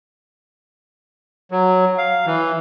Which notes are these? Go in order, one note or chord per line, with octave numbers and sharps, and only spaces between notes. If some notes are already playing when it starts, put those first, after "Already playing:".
F#3
F5
E3